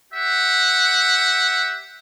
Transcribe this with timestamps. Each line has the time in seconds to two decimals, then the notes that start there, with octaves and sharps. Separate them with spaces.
0.13 G4 E5 F#5